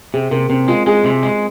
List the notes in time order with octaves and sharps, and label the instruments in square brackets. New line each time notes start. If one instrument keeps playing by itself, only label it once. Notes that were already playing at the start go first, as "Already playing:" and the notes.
[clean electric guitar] C3 [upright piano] G#4
[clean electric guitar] C3 [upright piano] A#3
[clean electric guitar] C3 [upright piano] C4
[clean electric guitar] G#3 [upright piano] F4
[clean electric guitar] G#3 [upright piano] G#4
[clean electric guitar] C3
G#3